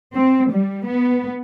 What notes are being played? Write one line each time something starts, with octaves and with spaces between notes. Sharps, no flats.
C4
G3
B3